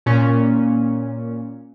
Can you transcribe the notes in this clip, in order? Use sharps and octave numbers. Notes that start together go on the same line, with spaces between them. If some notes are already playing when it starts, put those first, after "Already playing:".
A#2 C#4